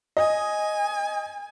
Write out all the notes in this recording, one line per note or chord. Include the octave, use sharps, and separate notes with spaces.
D#5 G#5